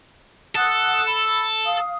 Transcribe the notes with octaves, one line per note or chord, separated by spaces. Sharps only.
A4 F#5 D#6 F#6
B5
F5 D#6